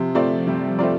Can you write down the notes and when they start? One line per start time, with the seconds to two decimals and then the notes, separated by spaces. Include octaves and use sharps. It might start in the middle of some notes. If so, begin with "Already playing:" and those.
Already playing: C3 F3
0.15 A3 C4 F4 D5
0.47 C3 G3
0.79 A3 C4 F4 D5